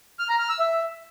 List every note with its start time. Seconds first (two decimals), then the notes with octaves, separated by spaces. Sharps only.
0.19 F6
0.29 A#5
0.39 F6
0.49 E6
0.59 E5